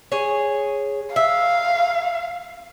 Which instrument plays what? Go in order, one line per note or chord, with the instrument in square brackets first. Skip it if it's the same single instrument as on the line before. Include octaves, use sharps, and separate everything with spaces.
[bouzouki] G#4 C#5
[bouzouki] E5 [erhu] F5